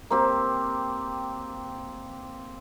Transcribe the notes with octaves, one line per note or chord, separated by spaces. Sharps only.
A#3 C4 G4